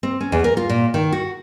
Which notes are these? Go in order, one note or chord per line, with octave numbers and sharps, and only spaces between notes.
C4
C#4
E2
A#4
F4
A#2
D#3
F#4